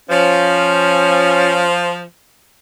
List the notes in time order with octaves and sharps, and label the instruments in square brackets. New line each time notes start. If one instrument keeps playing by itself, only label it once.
[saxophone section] F3 [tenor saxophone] C#4